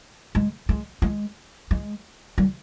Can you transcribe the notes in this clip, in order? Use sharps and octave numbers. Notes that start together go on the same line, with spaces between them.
G#3
G#3
G#3
G#3
G3